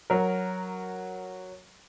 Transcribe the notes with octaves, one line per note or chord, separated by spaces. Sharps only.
F#3 A#4